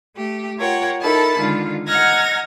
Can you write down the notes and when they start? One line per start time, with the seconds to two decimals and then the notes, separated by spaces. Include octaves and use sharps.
0.15 A3 G4
0.58 F4 A#4 C#5 F#5 G5
1.01 D#4 E4 A4 A#4 A5 B5
1.39 D3 D#3 G#3 F4
1.87 D#5 F#5 A#5 F6 G#6 A#6